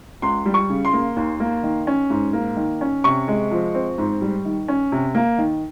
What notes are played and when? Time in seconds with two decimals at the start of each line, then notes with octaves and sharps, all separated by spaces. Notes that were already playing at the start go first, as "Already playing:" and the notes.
0.22 C#2 C6
0.46 G3
0.54 C#6
0.70 C#3
0.85 C6
0.93 A#3
1.16 D#2
1.40 A#3
1.63 D#3
1.87 C#4
2.10 G#2
2.33 A#3
2.57 D#3
2.81 C#4
3.04 C3 C#6
3.28 G#3
3.51 F3
3.75 C4
3.98 G#2
4.22 G3
4.45 D#3
4.68 C#4
4.92 C3
5.15 A#3
5.38 D#3